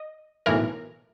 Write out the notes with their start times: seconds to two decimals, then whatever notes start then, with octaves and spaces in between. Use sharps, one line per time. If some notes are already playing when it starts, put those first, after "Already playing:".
Already playing: D#5
0.46 B1 A2 E3 A#4